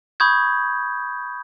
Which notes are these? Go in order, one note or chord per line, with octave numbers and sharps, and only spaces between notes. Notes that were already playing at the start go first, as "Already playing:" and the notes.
B5 C#6 D#6 G6 G#6